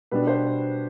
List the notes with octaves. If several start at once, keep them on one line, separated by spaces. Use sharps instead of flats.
B2 G3 D4 B4
C5